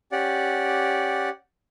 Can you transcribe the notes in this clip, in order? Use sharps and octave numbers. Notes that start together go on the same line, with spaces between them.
C#4 G4 D5 F#5